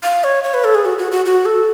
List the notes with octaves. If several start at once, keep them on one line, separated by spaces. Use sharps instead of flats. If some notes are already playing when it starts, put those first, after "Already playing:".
F5
C#5
C#5
B4
A4
G#4
F#4
F#4
F#4
F#4
A4